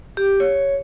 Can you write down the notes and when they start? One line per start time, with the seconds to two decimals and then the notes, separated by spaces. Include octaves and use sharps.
0.17 G4
0.40 C#5